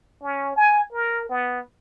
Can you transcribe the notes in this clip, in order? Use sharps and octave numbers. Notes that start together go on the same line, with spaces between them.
C#4
G#5
A#4
B3